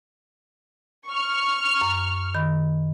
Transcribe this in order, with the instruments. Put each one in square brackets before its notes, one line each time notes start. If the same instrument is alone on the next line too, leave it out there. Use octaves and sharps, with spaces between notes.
[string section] C#6 F6
[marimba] F#2
D#3 B5